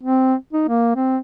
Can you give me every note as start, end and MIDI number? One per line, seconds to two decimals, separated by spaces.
0.03 0.34 60
0.53 0.64 63
0.68 0.93 58
0.96 1.18 60